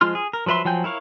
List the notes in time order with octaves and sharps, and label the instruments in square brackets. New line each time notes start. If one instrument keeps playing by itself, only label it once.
[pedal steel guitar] F3 G#3 F4 C6 F6
G#4
A#4
F3 F#3 B4 E5 C6
F3 F#3 G5 G#5 G6
E4 A#4 C#5 F5